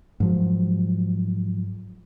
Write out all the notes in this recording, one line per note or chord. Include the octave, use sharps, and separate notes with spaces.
G#2 F3 F#3